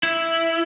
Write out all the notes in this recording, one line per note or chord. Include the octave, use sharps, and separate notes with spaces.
E4